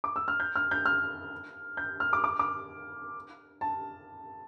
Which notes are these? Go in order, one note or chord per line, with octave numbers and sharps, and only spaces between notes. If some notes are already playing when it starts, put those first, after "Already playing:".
D6
E6
F6
G6
F6
G6
F6
G6
F6
D6
D6
D6
A5